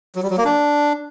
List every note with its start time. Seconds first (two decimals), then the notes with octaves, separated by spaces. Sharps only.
0.15 F#3
0.23 G3
0.30 F#3
0.37 A#3
0.45 D4